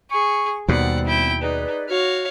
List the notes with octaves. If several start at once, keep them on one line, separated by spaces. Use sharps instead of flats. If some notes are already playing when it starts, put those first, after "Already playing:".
G#4 C#6
D#2 B2 G3 B3 C4 D5 F#5
E4 G5
D#4 G#4 B4 D5
F#4 C#5 F5